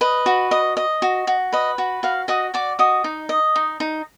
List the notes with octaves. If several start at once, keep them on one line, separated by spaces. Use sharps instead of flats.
B4 D#5
F#4
D#5
D#5
F#4
F#4
B4 D#5
F#4
F#4 F5
F#4 D#5 D#6
F#4 D5 D6
F#4 D#5 D#6
D#4
D#5
D#4
D#4